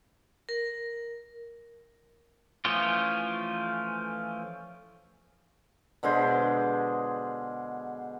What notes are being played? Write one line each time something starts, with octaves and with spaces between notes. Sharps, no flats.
A#4
E3 F3 A3 C#4 F4
B2 D3 G#3 C5